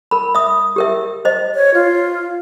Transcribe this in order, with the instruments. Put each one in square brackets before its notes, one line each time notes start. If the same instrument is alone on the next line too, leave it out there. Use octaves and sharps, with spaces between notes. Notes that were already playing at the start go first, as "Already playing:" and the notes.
[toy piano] A#4 B5
E5 D#6
G4 A#4 E5
C5 D#5
[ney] C#5
F4